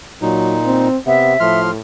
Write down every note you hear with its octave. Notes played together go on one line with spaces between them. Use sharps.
A#2 F#3 D#4
C4
C3 B3 E5
A2 F3 C6 F6